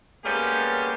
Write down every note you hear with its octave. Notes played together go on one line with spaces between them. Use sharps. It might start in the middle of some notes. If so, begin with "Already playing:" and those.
G3 G#3 A#3 B3 C#4 G4